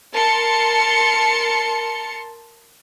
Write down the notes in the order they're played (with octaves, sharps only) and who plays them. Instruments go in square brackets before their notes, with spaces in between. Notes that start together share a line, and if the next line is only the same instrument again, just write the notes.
[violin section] A#4 A5 C6 C#7